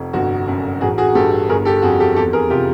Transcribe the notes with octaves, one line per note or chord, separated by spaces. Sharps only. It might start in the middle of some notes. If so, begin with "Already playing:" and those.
Already playing: F1 F2
G1 F#4
F#2
A1 F#4 G#4
F#4 G#4
G2 G4 A4
G1 G#4 A#4
G4 A4
F2 F#4 G#4
G4 A4
E2 G4 A4
G#4 A#4
C3 F4 G4